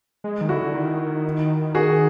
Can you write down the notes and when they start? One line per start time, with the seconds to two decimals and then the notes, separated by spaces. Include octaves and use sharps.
0.24 G#3
0.41 D#3
0.49 D3 E4 F#4
0.62 D3
0.75 D#3
1.75 F#4 G#4